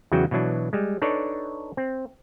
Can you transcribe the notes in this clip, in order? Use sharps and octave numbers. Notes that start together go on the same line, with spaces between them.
E2 C#3 E3 F#3 F#4 G5
B2 E3 F#3 D4
G3 G#3
D4 D#4 A4 B4 C#5 D5
C4